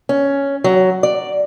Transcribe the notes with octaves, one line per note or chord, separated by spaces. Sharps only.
C#4
F#3
D5